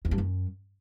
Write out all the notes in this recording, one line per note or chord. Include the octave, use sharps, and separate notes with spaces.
E2
G2
F#2